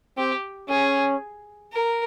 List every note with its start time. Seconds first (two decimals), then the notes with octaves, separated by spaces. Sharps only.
0.17 C4 G4
0.69 C#4 G#4
1.73 A#4